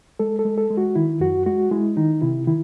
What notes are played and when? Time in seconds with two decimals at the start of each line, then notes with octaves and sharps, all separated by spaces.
0.19 G#3 A4
0.39 A4
0.45 G#3
0.58 A4
0.70 G#3
0.77 F#4
0.95 D#3 E4
1.20 F#2 F#4
1.46 G#3 F#4
1.71 G#3 E4
1.97 D#3 D#4
2.22 C3 E4
2.47 D#3 E4